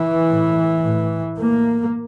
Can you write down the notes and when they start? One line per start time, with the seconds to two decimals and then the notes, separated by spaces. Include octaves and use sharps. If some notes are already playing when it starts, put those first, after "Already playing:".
Already playing: E3
0.29 A2
0.84 A2
1.37 A2 A#3